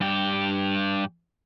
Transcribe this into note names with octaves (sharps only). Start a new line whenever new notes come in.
G2 G4